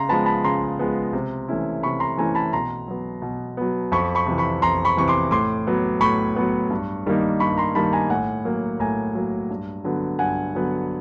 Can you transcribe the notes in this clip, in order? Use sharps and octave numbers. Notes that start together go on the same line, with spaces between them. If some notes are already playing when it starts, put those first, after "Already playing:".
Already playing: C#3 A#5 C6
F3 G#3 B3 A5 B5
A5 B5
C#3 A#5 C6
F3 G#3 B3
C3
E3 A3 C#4 E4
C3 B5 C#6
A#5 C6
E3 A3 C#4 E4 G#5 A#5
A5 B5
B2 A#5 C6
F#3 B3
B2
F#3 B3
F2 B5 C#6
B5 C#6
C3 E3
B5 C#6
F2 A#5 C6
B5 C#6
C3 E3 C#6
C6 D6
A2 C6 D6
F#3 B3
A2 B5 C#6
F#3 B3
G2
D#3 G3 A#3 D#4
G2 B5 C#6
A#5 C6
D#3 G3 A#3 D#4 A5 B5
G#5 A#5
A2 F#5 G#5
F#3 A#3
A2 G#5 A#5
F#3 A#3
G2
D3 F#3 B3
G2 F#5 G#5
D3 F#3 B3